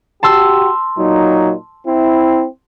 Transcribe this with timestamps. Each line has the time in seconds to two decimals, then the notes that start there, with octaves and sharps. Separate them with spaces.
0.23 F#4 G4 A5 C6 E6
0.97 A#2 F#3 D#4
1.87 C4 E4